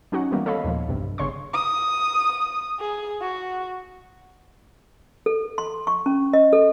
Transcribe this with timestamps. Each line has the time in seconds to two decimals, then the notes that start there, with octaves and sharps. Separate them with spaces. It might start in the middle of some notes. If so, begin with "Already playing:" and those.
0.12 F#3 C#4 D#4 F#4 F#5
0.32 D#3 E3 G3 A#3 B3
0.46 A4 C#5 D#5 F5 B5
0.64 D#2 A#2 F3
0.88 B1 G2 C3
1.18 G1 C#3 C#5 C6 C#6
1.54 D#6
2.80 G#4
3.21 F#4
5.26 A4
5.58 C6
5.87 C#6
6.06 C#4
6.33 D#5
6.53 A4